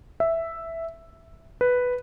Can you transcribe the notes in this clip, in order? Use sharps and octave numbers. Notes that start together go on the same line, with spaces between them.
E5
B4